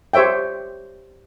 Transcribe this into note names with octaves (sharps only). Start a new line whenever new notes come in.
G4 C5 C#5 E5 G5